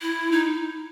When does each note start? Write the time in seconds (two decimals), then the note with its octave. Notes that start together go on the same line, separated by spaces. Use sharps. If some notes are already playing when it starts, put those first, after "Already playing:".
0.02 E4
0.32 D#4